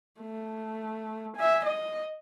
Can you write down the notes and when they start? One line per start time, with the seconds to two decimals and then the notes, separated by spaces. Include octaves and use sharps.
0.21 A3
1.36 E5 G#5
1.64 D#5